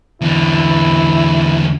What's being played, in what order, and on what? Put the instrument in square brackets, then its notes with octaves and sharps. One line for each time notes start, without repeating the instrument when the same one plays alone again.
[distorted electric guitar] E2 D3 [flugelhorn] E4